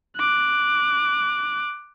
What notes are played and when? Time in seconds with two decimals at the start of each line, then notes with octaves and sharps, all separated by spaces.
0.17 D6 F#6